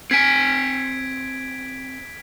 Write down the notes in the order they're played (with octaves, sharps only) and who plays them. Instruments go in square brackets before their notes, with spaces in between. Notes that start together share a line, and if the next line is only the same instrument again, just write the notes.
[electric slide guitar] C4 G#5 [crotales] G#6 B6 D7